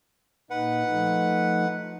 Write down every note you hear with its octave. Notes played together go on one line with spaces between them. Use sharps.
A#2 D#4 B4 F#5
F3 A3 D#4